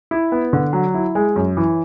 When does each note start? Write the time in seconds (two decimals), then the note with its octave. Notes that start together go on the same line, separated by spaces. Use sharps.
0.11 E4
0.32 B3
0.53 D3
0.73 F#3
0.94 E4
1.15 G#3
1.36 F#2
1.57 E3